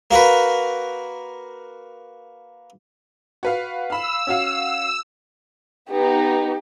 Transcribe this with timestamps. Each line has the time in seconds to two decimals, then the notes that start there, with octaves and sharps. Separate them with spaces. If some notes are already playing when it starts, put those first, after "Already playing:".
0.11 A#3 F#4 A#4 B4
3.43 F#4 B4 F5
3.90 F5 B5 E6
4.27 C#4 F#4 F5
5.90 B3 D#4 G4